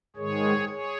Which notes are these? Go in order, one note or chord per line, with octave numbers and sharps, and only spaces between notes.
G#2 D#3 G#3 G#4 C#5
G#4 C#5